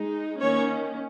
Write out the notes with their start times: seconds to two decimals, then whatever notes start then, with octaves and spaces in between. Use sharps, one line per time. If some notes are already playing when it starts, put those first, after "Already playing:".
Already playing: G#3 D#4
0.40 D#3 A#3 C#4 C#5